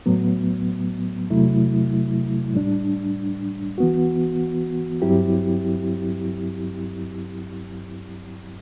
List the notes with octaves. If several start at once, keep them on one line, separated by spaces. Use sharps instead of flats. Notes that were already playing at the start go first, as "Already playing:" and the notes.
A2 F#3 B3
E2 C3 F#3 A3 E4
A2 G3 D4
E3 B3 F#4
G2 F#3 C4 E4 G4